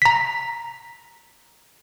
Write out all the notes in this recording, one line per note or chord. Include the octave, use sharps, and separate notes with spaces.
A#5 B6